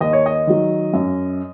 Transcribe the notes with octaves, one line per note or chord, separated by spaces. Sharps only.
D#2 D#5
C#5
D#5
D#3 F#3
F#2